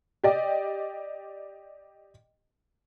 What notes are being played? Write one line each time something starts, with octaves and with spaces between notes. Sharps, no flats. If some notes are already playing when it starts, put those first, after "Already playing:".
G4 D5 D#5